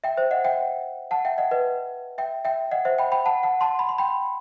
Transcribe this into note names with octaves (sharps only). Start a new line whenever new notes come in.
E5 G5
C5 E5
D#5 F#5
E5 G5
F#5 A5
E5 G5
D#5 F#5
B4 D#5
E5 G5
E5 G5
D#5 F#5
C5 E5
G5 B5
G5 B5
F#5 A5
F#5 A5
A5 C6
B5
C6
G5 B5